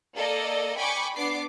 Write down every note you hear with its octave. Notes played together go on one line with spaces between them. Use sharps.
A#3 A4 D5 D#5
G5 G#5 B5 C#6 D6
B3 D4 D6 C7